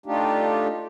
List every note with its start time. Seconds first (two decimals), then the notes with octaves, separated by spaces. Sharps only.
0.06 A3 D4 D#4 F4 G4